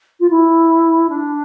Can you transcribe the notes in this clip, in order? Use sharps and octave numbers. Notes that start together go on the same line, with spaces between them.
F4
E4
D4